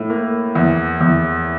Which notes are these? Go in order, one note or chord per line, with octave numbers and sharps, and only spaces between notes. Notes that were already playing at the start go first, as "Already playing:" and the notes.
Already playing: A2
A#3
E2
E2